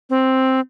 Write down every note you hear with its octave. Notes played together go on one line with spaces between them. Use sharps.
C4